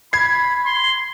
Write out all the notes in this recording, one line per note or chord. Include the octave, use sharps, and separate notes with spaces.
B5 G#6 C7
C6